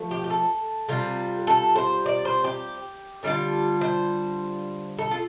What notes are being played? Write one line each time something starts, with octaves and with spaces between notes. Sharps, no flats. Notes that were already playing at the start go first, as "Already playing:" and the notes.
Already playing: F3 A3
G4
G4
A4
C3 G3 F4
A4
C5
D5
C5
G4
D3 G3 D4 F4
C5
A4
F4